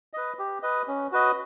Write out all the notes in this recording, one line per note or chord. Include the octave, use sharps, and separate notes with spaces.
B4 D#5
G4
B4 D#5
C#4
F#4 B4 D#5